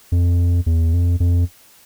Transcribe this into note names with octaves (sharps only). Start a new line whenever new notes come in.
F2
E2
F2
F2